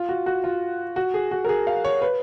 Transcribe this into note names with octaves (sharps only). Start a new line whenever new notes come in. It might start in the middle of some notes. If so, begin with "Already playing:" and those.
Already playing: F4
F#4
F#4
F4
F#4
G#4
F#4
A#4
G#4
F5
C#5
B4